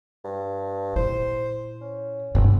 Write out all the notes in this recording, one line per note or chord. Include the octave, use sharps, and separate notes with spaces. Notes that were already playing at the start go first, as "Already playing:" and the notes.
G2
A#2 E4 C5
C#4
G1 G#2 C3